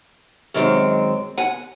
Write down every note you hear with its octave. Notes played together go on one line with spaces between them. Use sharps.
F#2 D#3 G#3 C4
F#5 G#5